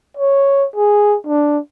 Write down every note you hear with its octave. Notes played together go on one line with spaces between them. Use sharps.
C#5
G#4
D4